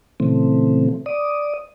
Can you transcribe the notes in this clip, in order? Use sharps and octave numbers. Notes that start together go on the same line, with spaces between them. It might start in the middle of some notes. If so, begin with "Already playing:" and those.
A#2 C#3 E3 A3 C4
D5 D#6